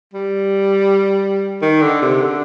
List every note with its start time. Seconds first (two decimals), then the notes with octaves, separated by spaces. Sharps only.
0.14 G3
1.62 D#3
1.82 D3
2.02 C3
2.21 D3